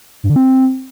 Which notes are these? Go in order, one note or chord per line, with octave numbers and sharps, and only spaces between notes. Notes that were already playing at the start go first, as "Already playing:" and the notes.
G2
D3
C4